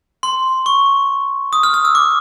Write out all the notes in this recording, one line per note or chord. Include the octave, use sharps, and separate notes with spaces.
C6
C#6
D#6
F6
F6
E6
D6